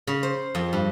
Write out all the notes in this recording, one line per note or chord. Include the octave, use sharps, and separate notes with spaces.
C#3
C5
F2
G2